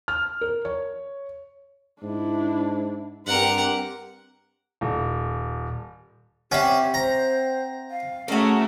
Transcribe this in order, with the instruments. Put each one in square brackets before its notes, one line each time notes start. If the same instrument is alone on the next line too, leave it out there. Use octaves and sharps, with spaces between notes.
[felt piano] F6
A#4
C#5
[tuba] G#2 [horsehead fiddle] D4 E4
[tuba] G2 [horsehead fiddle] C4 G4 [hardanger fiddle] A#4 F#5
[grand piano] D#1
[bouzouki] C4 E5 F#5 [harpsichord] C#4 [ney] G4
[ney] C5 [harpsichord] A#5
[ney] F5
[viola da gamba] A3 C#4 [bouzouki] F#4 A#4 [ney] G#4